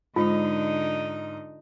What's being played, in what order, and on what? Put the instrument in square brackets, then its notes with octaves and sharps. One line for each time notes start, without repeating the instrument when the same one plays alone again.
[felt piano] G#2 [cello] D3 D#4 [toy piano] F4